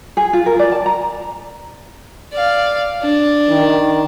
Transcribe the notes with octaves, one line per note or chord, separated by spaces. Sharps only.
G#4
F4
A#4
D5
A5
A#5
D5 F5
D4
D#3